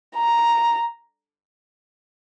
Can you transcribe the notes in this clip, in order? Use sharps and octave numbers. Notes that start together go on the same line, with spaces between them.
A#5